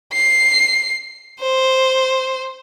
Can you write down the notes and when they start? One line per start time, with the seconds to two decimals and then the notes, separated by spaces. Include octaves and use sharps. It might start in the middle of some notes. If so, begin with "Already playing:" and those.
0.13 C7
1.41 C5